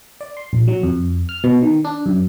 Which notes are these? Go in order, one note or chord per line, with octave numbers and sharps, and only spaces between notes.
D5
C6
A#1
F#3
F2
F6
B2
D#3
D4
F#2